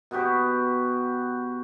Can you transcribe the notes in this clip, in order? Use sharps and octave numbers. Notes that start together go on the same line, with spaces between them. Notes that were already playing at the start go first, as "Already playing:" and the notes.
B2 B3 F#4 G4